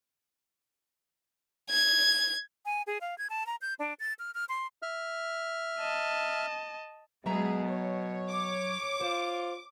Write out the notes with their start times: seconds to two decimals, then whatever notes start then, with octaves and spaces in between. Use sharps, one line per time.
1.70 G#6
2.66 G#5
2.87 G#4
3.01 F5
3.18 G#6
3.30 A5
3.47 A#5
3.62 G6
3.79 D4
4.00 A6
4.19 F6
4.35 F6
4.49 C6
4.82 E5 F6
5.79 D#5 A5
7.26 B2 F#3 G#3 B3 G#4 E5 A#5
7.67 C#5
8.29 D6
9.01 F4 C5